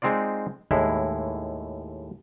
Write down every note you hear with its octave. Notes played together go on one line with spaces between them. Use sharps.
G#3 C4 D#4 F4 D5
D#2 A2 G#3 E4